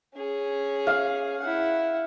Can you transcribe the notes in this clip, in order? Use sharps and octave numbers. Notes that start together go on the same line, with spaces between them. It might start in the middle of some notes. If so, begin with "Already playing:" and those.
C#4 G#4
F5
E4 F#5